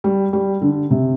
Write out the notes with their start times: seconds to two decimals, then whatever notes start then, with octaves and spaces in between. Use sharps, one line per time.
0.04 G3
0.33 G3
0.61 D3
0.91 C3